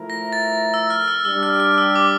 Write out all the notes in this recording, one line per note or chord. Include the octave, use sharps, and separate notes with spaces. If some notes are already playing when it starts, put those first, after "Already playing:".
Already playing: F3 A3 E4 A#4
A#6
A6
E6
F6
E6
G3 D4 G4 E6
F6
F6
E6
D6